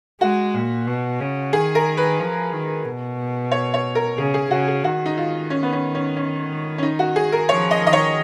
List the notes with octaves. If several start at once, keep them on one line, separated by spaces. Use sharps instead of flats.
G#3 F#4
A#2
B2
C#3
D#3 G#4
A#4
B4
F3
D#3
B2
C#5
C#5
A#4
C#3 G#4
G#4
C#3 F#4
G#4
D#3 F#4
D#4
F4
C#4
B3
C#4
C#4
C#4
C#4
D#4
F#4
G#4
A#4
F3 C#5
D#5
D#3 D#5
C#5